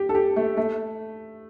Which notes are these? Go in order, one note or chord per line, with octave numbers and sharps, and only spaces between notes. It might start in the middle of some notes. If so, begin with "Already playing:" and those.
Already playing: G4
A4
G4
A3
A3